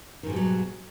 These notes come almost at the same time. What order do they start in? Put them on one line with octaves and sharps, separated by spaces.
D#3 G#2 B2 G3 F#3